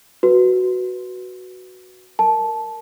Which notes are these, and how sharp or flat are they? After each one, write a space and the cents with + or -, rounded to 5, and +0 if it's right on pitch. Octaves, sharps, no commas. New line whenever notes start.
F#4 +0 B4 +0
A#4 -5 A5 -15